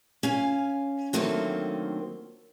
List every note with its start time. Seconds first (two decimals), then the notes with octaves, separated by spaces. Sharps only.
0.23 C#4 F5 G#5
1.13 D3 D#3 F#3 A3 A#3 C4